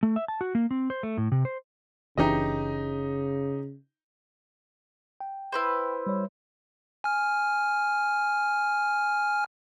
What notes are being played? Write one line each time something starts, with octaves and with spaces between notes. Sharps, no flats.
A3
E5
A5
F#4
A#3
C4
C5
A3
A2
C3
C5
F#1 C#3 E3 D4 D#4 G4 D#5
G5
E4 B4 C5
G3 C#5
G#5 F6